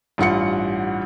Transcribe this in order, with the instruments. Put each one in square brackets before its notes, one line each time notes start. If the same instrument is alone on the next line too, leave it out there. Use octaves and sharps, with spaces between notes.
[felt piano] A1 G2 F4 F#5 C#7